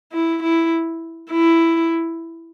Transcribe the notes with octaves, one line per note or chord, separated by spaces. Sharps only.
E4
E4
E4